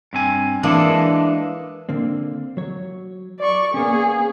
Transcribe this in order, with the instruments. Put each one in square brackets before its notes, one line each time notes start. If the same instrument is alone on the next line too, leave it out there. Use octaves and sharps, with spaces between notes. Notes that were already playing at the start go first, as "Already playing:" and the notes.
[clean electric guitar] G2 C4 G#5
[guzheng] E3 A#3 D4 [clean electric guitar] G#3 A4
[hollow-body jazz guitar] D3 A#3 C4
F#3 C#5
[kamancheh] D5 C#6
[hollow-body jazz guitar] A#3 B3 C#4 [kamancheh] G#4